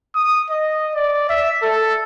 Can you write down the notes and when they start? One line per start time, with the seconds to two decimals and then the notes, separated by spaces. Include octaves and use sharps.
0.15 D#6
0.50 D#5
0.95 D5
1.29 E5
1.63 A4